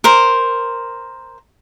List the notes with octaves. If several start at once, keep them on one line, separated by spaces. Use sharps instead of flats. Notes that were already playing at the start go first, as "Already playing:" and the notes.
A#4 C5